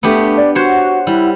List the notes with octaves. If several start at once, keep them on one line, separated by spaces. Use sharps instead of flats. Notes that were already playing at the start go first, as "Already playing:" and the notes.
A3 B3 D4 G4
D5
F#4 C5 C#5 F#5
G3 E4